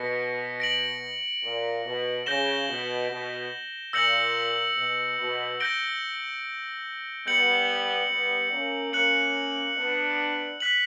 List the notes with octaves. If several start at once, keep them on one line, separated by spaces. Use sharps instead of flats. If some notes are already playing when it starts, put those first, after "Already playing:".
Already playing: B2 A#6 C#7
A#6 D7 F#7
A#2
B2
C#3 G6 A#6 E7 G7
B2
B2
A#2 E6 G6 A#6 C#7 F#7
B2
B2
G6 A#6 D7 G7
G3 B3 G6 C#7 F#7
G3 B3
A#3 C#4
A#3 C#4 F#6 C#7 F#7
B3 D4
F#6 B6 F#7